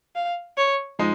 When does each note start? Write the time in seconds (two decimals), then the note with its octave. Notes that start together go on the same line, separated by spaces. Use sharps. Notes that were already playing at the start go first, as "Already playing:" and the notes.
0.16 F5
0.57 C#5
0.99 F3 G#3 D#4